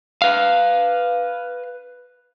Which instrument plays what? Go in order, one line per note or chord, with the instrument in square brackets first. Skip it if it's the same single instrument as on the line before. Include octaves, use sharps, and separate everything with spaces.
[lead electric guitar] B4 F5